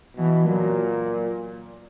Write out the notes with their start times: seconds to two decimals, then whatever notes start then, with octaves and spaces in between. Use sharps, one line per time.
0.16 B2 E3
0.47 A#2 F#3